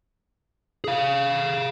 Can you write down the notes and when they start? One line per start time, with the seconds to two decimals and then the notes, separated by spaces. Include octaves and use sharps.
0.84 G#4 F5